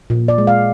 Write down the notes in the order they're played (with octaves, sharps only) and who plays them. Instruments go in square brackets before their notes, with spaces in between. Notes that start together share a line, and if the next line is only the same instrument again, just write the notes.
[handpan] A#2
D5
G#3
F5